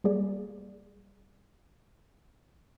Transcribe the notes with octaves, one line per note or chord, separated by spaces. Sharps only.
G3 A#3 G#4 D5